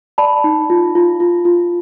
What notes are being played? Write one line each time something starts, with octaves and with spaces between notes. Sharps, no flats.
D5 A5 B5
D#4
F4
F4
F4
F4